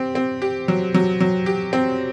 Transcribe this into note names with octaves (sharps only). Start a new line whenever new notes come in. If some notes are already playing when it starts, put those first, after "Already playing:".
Already playing: C4 G4
C4
G4
F#3
F#3
F#3
G4
C4